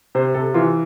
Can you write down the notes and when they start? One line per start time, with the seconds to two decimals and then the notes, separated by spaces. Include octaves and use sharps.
0.15 C3 C5
0.34 C3 A4
0.54 E3 F4